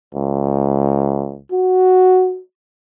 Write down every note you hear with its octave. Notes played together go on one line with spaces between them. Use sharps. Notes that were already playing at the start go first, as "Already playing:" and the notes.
C#2
F#4